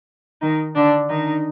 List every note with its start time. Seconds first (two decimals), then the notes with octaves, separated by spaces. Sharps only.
0.42 D#3 D#4
0.76 D3 D4
1.09 D#3 D#4